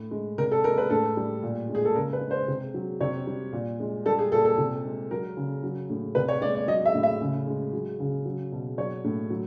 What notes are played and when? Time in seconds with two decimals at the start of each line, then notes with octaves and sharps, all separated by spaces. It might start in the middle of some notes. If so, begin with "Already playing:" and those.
Already playing: A2
0.11 G#3
0.38 C3 A#4
0.51 A4
0.64 G#3 A#4
0.78 B4
0.90 A2 A4
1.17 G3
1.43 A#2
1.69 G#3
1.75 G#4
1.85 A4
1.95 C#3 A#4
2.13 B4
2.21 G#3
2.31 C5
2.48 C3
2.74 F#3
3.01 C3 C#5
3.27 G3
3.52 A#2
3.80 G#3
4.06 G3 A4
4.19 G#4
4.32 A#2 A4
4.45 A4
4.58 C3
4.84 G#3
5.11 F#3 A#4
5.37 C#3
5.63 F#3
5.90 A2
6.15 C3 B4
6.28 C#5
6.41 G#3 D5
6.55 D5
6.67 F#3 D#5
6.86 E5
6.95 A2
7.03 E5
7.21 C#3
7.47 G#3
7.73 F#3
8.00 C#3
8.25 F#3
8.52 B2
8.78 F#3 C#5
9.04 A2
9.30 F#3